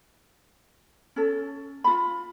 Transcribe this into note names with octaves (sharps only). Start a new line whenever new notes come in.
C#4 A4
F4 B5